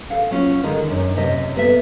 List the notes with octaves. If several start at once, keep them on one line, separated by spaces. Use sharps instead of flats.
A4 F5 F#5
F#3 C#4 F4
D3 D#3 G#3
F#2 D#4
F#2 C3 D#5
B3 A4 E5